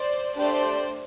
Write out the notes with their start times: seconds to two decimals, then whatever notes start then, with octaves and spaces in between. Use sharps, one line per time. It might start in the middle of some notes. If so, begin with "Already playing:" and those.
Already playing: C5 D5
0.37 A3 D4 G4 C5 D5